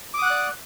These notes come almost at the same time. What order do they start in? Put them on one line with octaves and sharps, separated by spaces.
D6 D#6 F#5 F#6 D5